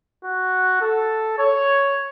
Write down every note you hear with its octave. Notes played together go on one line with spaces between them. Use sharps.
F#4
A4
C#5